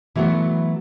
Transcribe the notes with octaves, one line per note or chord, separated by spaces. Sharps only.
E3 F#3 A3 B3 F#4